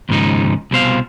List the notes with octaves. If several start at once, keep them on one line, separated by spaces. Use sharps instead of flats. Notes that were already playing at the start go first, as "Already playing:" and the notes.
D#2 G#2 C#3 F3 D#4
C2 B2 C5 F5